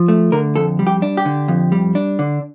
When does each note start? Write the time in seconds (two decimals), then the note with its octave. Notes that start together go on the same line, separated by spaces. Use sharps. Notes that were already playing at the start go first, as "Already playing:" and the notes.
Already playing: F3
0.08 A3
0.32 D3 A#4
0.56 F2 A4
0.79 G3
0.87 G4
1.02 D4
1.17 G4
1.25 D3
1.48 F2
1.72 G3
1.95 D4
2.19 D3